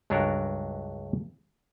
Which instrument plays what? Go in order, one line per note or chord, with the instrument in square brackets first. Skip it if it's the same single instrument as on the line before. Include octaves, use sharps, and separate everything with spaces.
[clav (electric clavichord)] C#2 G2 F#3 D4 A4 A#4